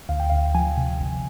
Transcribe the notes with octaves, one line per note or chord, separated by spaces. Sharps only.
D2 F5
G5
D2 F5
F3 G#5
C3
G1